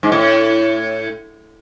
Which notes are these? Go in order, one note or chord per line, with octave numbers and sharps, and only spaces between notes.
G#2
A2